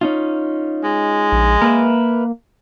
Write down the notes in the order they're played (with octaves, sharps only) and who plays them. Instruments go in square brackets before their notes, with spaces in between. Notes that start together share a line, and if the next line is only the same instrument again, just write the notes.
[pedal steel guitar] C#4 D#4 F4
[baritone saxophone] G#3
[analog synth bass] A#1
[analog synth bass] A#3 [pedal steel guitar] A#4 B4 E5